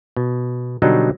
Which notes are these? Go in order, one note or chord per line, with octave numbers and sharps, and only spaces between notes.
B2
B2 D3 F#3 G3 D4 D#4